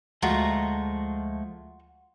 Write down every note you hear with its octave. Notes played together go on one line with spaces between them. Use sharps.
D2 F3 G#3 A3 F4 F#4 A#5